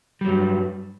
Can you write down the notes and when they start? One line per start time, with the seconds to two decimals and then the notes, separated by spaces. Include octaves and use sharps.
0.21 G3
0.24 F#3
0.27 G2